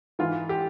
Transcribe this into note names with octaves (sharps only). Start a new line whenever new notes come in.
G#2 E3 F4
G4